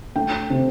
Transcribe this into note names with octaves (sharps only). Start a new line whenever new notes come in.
A3 G5
C3